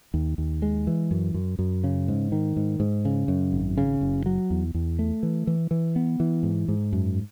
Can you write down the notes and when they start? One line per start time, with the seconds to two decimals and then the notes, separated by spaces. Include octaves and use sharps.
0.14 D#2
0.38 D#2
0.62 G#3
0.87 E3
1.11 F#2
1.34 F#2
1.59 F#2
1.84 C#3
2.08 G#2
2.32 D#3
2.56 G#2
2.80 G#2
3.05 C#3
3.28 F#2
3.52 G#1
3.78 C#3
4.01 F#1
4.26 F#3
4.50 E2
4.74 E2
4.99 A3
5.23 E3
5.47 E3
5.71 E3
5.96 B3
6.20 E3
6.43 G#2
6.68 G#2
6.93 F#2